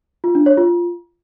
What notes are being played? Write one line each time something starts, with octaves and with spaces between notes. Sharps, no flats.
F4
D4
C#5
F4